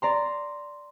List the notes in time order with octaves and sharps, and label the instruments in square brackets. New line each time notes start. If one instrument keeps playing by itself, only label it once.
[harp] D5 A#5 C6